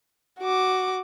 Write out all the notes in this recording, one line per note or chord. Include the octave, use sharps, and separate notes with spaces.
F#4 D6